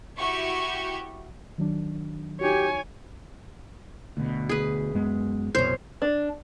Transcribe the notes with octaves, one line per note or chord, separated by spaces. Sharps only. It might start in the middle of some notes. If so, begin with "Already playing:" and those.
E4 F#4 G4 C#6
D#3 F#3 D4
D#4 F#4 G4 C#5 G#5
D2 B2
G#4 B4
F#2 G#3 B3
C2 F#2 B2 C5 C#5
D4